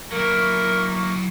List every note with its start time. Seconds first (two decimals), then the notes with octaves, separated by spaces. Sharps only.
0.12 F#3 A#3 E4 A#4 C#6